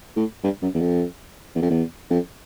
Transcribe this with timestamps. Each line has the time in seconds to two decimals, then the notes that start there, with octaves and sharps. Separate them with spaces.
0.16 A2
0.44 G2
0.62 F#2
0.75 E2
0.81 F2
1.56 E2
1.62 F2
1.70 E2
2.10 F2